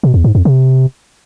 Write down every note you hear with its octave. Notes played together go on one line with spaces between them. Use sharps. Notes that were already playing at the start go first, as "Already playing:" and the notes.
B2
E2
G#2
F2
C3